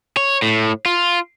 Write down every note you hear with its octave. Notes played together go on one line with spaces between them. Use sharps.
C#5
A2
F4